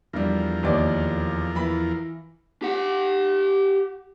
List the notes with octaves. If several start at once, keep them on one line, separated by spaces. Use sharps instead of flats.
E2 G2 F3 G3 A#4
D#2 C#5 D5
E3 B5
G4 F#5